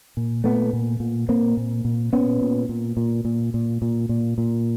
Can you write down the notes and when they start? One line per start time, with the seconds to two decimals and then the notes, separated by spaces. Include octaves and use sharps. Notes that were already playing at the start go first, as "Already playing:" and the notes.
0.17 A#2
0.44 A#2 A3 B3
0.73 A#2
1.00 A#2
1.29 A#2 A#3 C4
1.57 A#2
1.85 A#2
2.13 A#2 B3 C#4
2.41 A#2
2.69 A#2
2.97 A#2
3.25 A#2
3.54 A#2
3.82 A#2
4.09 A#2
4.38 A#2